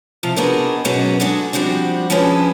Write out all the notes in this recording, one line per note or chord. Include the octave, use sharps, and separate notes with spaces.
C3 F3 F4
B3 D4 D#4 F#4 G#4 A#4
G#2 B2 F#3 B3 C#4 F#4
G#3 D4 F#4 G#4 A4
F3 G3 C4 D4 F#4
F3 G#3 C#4 D4 B4